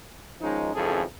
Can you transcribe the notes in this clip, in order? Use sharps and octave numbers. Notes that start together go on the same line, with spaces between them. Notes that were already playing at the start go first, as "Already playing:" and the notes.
D#3 F3 G#3 C#4 D#4
G#1 F2 C#3 E3 G#4 A4